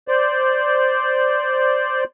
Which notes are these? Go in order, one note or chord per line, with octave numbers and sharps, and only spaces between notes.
C5 D5